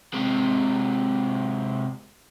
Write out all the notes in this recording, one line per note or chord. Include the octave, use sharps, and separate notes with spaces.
C3 G#3